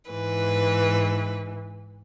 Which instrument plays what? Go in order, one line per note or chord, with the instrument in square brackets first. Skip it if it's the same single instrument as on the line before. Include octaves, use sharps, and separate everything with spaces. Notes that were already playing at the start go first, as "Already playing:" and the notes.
[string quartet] G#2 E3 B4